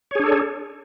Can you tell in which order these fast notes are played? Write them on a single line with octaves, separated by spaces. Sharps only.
C#5 G#4 D4 A4